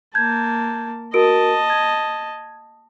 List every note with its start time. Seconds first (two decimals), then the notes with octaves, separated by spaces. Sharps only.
0.15 A#3 A5 G6 G#6
1.14 F#4 A#4 D#5 A5 D7
1.70 G#6